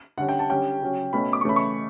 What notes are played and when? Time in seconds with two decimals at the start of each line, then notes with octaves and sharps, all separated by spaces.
0.18 D3 G3 C#4 F#5
0.29 G5
0.39 A5
0.49 D3 G3 C#4 G5
0.81 C#3 F#3 C#4
1.12 B2 A3 C#4 B5
1.33 D6
1.41 C#6
1.44 C#3 E3 A3 C#4 B5
1.56 C#6